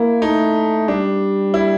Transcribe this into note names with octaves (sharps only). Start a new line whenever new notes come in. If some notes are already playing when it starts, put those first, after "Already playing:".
Already playing: A#3 E4
A3 D#4
G3 D4
E4